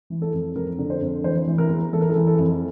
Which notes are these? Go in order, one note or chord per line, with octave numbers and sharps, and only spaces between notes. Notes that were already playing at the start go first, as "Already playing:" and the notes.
E3
A4
F2
F2 A#4
D3
C5
F2
E3 C5
E3
A#4
E2
E3 A4
A#4
A4
E3
A4
F2